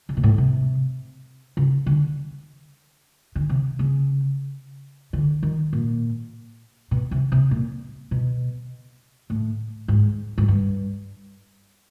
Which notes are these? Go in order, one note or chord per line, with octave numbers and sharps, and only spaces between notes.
C#3
A#2
A2
C3
C#3
D3
D3
C3
C#3
D3
D#3
A#2
B2
C3
C3
A#2
B2
A2
G#2
G#2
G2